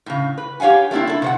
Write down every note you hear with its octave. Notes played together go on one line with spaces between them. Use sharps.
A2 C#3
B4
G4 C#5 F5 F#5 G#5
A3 A#3 C4 D4 E4
E4 A4
C3 C5 F#5